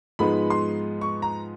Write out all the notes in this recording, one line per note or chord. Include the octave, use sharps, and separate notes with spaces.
G#2 F3 G#3 B3 D#4 B5
C6
C#6
A#5